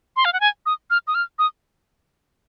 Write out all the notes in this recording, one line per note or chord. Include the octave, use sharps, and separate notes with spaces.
C6
F5
F#5
G#5
D#6
F6
D#6
F6
D#6